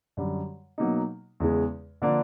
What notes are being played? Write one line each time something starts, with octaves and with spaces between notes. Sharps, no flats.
F#2 D3 G3
B2 F#3 A#3 D#4
E2 C#3 E3 G#3
D3 F3 A#3 D4